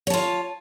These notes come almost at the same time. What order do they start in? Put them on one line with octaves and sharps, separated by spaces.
C#5 A5 F4